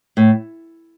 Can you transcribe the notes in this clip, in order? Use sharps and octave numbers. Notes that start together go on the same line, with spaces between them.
A2